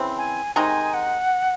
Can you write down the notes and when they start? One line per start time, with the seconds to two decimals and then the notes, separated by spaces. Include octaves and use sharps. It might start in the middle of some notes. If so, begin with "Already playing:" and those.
Already playing: C#3 E3 C4
0.18 G#5
0.56 C3 D#3 G#3 D#4 G#5
0.94 F#5